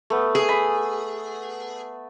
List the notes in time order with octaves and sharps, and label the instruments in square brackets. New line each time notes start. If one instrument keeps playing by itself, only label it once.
[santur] A3 B3
[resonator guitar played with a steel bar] G#4
[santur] B5